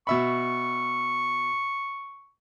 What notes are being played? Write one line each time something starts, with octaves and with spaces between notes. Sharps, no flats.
B2 E5 B5 C#6